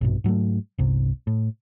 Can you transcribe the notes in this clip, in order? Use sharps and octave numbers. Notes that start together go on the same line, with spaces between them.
A#1 G2 B2
G#2 F#3 G3 A3
G1 C2 C3
A2